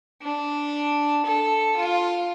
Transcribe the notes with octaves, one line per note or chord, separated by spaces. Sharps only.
D4
A4
F4